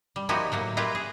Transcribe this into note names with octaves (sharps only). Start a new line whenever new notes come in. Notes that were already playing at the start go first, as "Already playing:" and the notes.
G3
F3 A#3 D#4 E4 F#4 G4
A2 F#3 A#3
E4 F4 G4 A#4 B4 E5
G#4